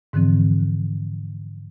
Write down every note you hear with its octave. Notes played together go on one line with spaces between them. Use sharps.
G#2 D3 E3 F3 C4